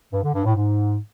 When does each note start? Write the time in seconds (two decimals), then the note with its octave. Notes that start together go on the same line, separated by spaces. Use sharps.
0.13 G2
0.23 D3
0.34 G2
0.45 A2
0.56 G#2